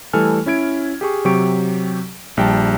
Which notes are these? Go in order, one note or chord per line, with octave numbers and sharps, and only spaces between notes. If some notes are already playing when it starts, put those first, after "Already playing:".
E3 G3 A3 A4 G#5 F6
C#4 E4 G#6 D7
G4 G#4 C#6
C3 F#3 G4 C#6 D7
A#1 G3 G5 A5